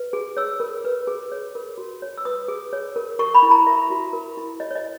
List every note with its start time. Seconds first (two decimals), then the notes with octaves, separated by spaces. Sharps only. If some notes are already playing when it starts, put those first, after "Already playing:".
Already playing: B4
0.13 G#4
0.37 C#5 E6
0.60 A#4
0.85 B4
1.07 G#4
1.32 C#5
1.55 A#4
1.78 F#4
2.02 C#5
2.18 E6
2.25 B4 D#6
2.48 G#4
2.73 C#5
2.96 A#4
3.19 A#4 C#6
3.34 B5
3.43 E4
3.51 A#5
3.66 A#4 E5
3.90 F#4
4.13 A#4
4.37 E4
4.60 C#5 D#5
4.71 C#5
4.75 D#5